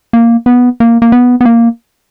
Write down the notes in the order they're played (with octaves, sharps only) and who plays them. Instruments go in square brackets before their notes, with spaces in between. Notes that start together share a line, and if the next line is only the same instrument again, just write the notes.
[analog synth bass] A#3
B3
A#3
A#3
B3
B3
A#3